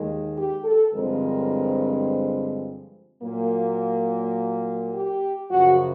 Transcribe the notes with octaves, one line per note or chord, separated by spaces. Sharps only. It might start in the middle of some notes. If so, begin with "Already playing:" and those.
Already playing: D#2 D#3 G#3
G4
A4
G2 D3 F3 G#3 C4 A#4
A#2 F#3 A#3
G4
F#2 C#3 F3 F#4